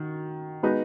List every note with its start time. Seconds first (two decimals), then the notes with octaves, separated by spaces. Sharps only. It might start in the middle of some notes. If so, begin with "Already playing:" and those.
Already playing: D#3 F#4
0.63 G#3 B3 D#4 F#4 B4